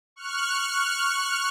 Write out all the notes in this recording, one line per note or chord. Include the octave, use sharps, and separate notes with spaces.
C#6 F6 F#6